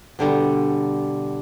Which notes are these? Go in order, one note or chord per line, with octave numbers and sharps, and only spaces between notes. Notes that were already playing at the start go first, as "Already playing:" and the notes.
B2 D3 G3